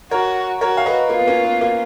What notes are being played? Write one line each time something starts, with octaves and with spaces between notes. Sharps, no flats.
F#4 A#4 C#5
F#4 A#4 C#5
F5
B4 D#5
A#3 F4
B3
A#3 C#4
B3
A#3